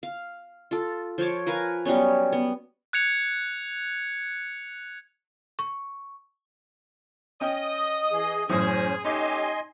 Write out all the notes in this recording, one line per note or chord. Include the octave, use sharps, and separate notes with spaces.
F5
F4 A4
F3 C5 C#5 D6
A#4 B4 F5 G#5
F#3 G3 B3 C#4
B3
F#6 G#6 C#7 F7
C#6
C#4 D#5 G5
E3 G#4
F#2 A2 E3 C#4 G#4 C5
A3 C#4 D#4 G4 D#5 G#5 C6